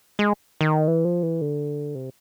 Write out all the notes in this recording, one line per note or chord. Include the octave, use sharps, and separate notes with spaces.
G#3
D#3
E3
F3
E3
D3
C3